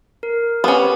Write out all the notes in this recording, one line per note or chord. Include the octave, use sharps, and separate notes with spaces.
A#4
B3 C#4 G4